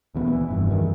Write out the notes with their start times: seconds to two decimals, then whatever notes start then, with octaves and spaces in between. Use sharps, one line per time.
0.15 D2 A#2 E3 B3
0.33 E3
0.48 F1 G2 E3
0.71 F#2 D#3 E3